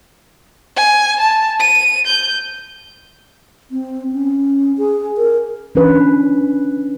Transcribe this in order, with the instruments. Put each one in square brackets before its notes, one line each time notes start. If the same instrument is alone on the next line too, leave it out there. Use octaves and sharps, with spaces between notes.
[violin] G#5
A5
D#7
G6
[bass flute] C4
C#4
G#4
A#4
[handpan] E3 C#4 D4 B4